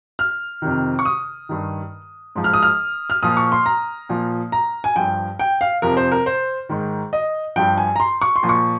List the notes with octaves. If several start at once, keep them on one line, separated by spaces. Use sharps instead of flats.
F6
F2 C3 D#3
C#6
D#6
G2 D#3
G#2 F3
F6
D#6
F6
F6
A#2 F3 D#6
C#6
C6
A#5
A#2 F3
A#5
G#5
G2 F3 G5
G5
F5
F2 C3 F3 A#4
C5
A#4
C5
G#2 D#3
D#5
G2 F3 G5
G#5
A#5
C6
C#6
C6
A#2 F3
C#6